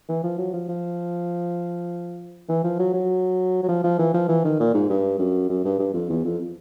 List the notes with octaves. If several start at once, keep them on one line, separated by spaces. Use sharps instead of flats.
E3
F3
F#3
F3
F3
E3
F3
F#3
F#3
F#3
F3
F3
E3
F3
E3
D#3
A#2
G#2
G2
F#2
F#2
G2
G2
F2
E2
F2